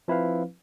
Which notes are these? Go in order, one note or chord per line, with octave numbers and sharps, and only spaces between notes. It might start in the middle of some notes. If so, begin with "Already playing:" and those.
F3 C4 E4 B4 F5